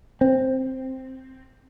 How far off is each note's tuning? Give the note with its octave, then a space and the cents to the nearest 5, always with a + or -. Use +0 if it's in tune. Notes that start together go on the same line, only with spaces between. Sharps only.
C4 +0